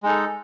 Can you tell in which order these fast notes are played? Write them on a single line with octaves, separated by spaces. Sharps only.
G#3 D#4 A4